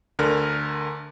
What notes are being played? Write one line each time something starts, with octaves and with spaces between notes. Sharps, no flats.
D2 D3 A#4 F6